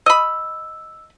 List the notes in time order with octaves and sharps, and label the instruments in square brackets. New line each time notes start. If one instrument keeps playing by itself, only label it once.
[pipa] D#5 B5 [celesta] E6